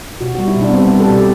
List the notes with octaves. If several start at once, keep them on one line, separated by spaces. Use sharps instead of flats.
B2 F#4
G3 F#4
E4
B2 D4
B3
G3 C4
G3 B3
A4
B2 G4